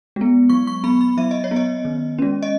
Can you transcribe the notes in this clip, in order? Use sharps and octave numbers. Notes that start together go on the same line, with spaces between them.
G#3 B3
F#3 C#6
C#6
B3 B5
B5
F#3 E5
D#5
C#5
B3
D#5
D#3
G#3 C#4
D#5